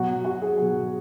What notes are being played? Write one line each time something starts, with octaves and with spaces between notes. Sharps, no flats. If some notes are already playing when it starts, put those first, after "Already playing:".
Already playing: B2 F#3 F#4
F#4
G#4
B2 F#3